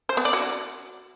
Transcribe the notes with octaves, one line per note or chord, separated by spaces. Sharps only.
C5
B3
D5
F#4